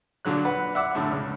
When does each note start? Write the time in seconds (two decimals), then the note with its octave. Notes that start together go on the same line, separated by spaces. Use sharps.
0.25 A#2 D3 F#3 F#6
0.45 B4 F#5
0.75 E5 F#5 D6 E6
0.95 F#2 A2 D3 A5
1.11 C#2